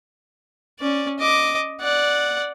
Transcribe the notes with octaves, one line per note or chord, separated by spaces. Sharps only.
C#4 D5
D#5 D6
D5 F#5